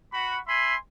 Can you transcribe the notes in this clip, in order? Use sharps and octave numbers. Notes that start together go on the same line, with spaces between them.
F#4 B5
E5 G#5 B5 C6